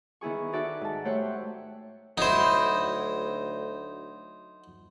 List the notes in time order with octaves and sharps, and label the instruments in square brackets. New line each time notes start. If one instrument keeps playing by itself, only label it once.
[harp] D#3 B3 E4 G#4 C#6
D#4 F#4 A4 D5 E5 F#5
G#2 A5
A3 G4 C5 C#5 E5 F#5
[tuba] D2 [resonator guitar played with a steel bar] F#3 E4 [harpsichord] D#4 C5